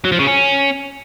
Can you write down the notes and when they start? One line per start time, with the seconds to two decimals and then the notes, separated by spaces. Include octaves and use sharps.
0.05 F#3
0.12 F3
0.19 C#3
0.26 C#4